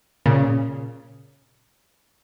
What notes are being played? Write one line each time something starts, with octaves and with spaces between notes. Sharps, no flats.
A#2 C#3